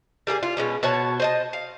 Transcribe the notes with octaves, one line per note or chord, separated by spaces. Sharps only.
G3 A#3 D4 G#4
F4
B2 G#3 C#4
B2 F#4 C#5 A5
C5 D#5 A5
F5